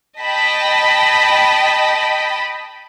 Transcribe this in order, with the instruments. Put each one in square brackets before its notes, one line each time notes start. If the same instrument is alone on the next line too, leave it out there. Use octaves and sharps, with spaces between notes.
[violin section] D#5 G5 A5 B5 B6